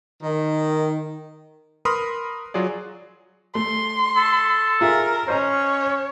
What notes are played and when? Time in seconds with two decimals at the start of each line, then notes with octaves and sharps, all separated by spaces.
0.22 D#3
1.85 A#4 B4 B5 C6 D#6 F6
2.54 F#3 F4 G#4 D5
3.55 A3 C6
4.16 A4
4.81 F4 G#4 A#4 E5
5.28 C#4 C5 C#5 D#5 A#5